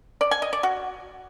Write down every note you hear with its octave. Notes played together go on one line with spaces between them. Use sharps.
D5
G#5
D#5
D5
F#4